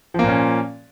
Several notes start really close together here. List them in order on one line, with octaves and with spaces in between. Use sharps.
F3 A#3 A#2 C#4